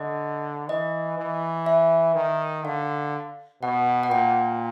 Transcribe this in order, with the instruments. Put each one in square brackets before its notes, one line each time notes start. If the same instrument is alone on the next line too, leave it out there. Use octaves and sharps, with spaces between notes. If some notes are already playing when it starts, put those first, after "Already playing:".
Already playing: [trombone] D3 [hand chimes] D#5
[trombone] E3 [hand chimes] D#5
[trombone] E3
[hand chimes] E5
[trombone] D#3
[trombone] D3 [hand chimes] F5
[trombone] B2 [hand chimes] F#5
[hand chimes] F#5
[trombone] A#2 [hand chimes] G5